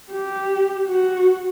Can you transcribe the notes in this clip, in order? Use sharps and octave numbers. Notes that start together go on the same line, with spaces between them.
G4
F#4